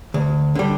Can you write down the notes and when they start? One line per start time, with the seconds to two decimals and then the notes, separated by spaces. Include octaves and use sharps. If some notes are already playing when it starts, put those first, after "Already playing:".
0.14 D2
0.55 D3 G3